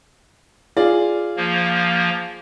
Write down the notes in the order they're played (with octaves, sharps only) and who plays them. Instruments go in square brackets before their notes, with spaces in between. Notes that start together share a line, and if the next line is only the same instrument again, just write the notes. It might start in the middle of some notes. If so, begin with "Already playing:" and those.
[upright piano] F4 G#4 D5
[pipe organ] F3 A#3